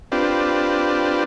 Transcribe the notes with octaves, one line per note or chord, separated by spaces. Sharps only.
C4 D4 F4 G4 B4